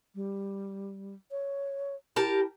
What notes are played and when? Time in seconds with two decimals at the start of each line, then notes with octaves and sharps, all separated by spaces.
0.15 G3
1.31 C#5
2.16 E4 G4 A#4 A5